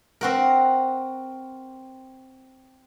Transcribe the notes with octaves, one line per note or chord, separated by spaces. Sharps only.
C4 F#4 A#4